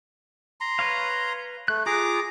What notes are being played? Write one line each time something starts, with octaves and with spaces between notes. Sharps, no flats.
A#5 C6
B4 C#5 F5
A3 F#6
F4 G#4 A#5 D6